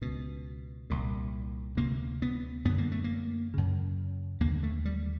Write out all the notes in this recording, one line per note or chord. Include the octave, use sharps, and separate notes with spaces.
C#2 B2
C2 A#2
D2 C3 A#3
B3
F#2 D3 B3
A#3
A3
A#3
F#2 C#3
D#2 D3 A#3
A3
G3